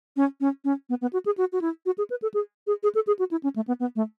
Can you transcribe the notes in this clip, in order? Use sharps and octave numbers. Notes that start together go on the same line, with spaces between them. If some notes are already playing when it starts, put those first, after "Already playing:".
C#4
C#4
C#4
B3
B3
F#4
G#4
F#4
F#4
E4
F#4
G#4
B4
A4
G#4
G#4
G#4
A4
G#4
F#4
E4
C#4
A3
B3
B3
A3